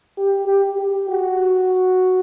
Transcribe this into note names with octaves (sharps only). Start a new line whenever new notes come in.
G4
G4
G4
F#4